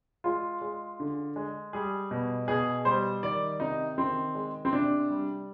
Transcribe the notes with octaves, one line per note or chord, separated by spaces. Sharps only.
G#3 F4
G#3
D3
G#3
G3 G#4
B2
B2 G#4
G3 C5
D#3 D5
C3 D#4
D#3 C4
G#3
C4
C3 D4
G3